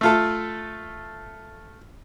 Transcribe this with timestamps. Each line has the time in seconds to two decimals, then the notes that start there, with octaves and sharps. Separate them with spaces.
0.01 A3 F4 A4